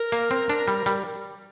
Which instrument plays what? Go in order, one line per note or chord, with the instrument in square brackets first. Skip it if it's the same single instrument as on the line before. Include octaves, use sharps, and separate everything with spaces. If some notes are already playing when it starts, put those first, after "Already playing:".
Already playing: [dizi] A#4
[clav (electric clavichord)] A#3
C4
D4
G3
G3